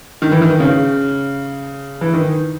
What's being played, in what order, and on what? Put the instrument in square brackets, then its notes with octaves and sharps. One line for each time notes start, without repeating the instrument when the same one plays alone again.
[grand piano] D#3
E3
D#3
C#3
E3
D#3